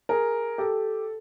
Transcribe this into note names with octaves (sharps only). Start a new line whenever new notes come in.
G#4 A#4
G4 A4